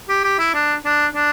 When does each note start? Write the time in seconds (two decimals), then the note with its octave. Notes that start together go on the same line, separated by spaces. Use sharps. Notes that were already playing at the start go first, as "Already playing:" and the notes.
0.09 G4
0.24 G4
0.39 E4
0.54 D4
0.85 D4
1.15 D4